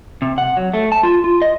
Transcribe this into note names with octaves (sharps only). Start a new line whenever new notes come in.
C3
F#5
F#3
A3
A5
F4
F4
D#5